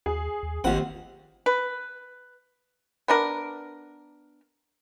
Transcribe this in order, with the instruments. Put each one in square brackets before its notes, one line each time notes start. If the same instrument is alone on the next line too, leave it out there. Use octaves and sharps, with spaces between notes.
[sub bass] D#2 [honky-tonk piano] G#4
[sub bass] D#2
[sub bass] G#1 [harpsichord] D#2 F#5 [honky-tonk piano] C4 F4
[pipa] B4
B3 D4 A#4